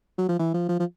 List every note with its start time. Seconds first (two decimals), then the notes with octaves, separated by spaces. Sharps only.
0.18 F#3
0.29 F3
0.39 E3
0.54 F3
0.69 F3
0.80 F3